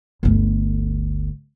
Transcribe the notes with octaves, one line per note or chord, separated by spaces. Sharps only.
G1 D2